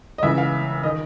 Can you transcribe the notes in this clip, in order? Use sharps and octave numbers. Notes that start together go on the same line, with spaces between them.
D#5
C#2 C#3 E3 E5
F5
D#3 D#5